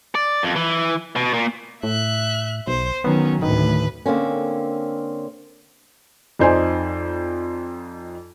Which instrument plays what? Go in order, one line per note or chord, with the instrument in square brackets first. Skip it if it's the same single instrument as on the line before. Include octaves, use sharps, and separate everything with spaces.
[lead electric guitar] D5
F2
E3
B2
A#2
[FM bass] A2 [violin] E5 F#6
[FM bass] B1 [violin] C5
[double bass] D#3 F#3 [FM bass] B3 [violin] C#4
[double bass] D2 A2 [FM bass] D#3 [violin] B4
[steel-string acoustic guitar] D3 A#3 C4 C#4
[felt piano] F2 D#4 C5 D5 G#5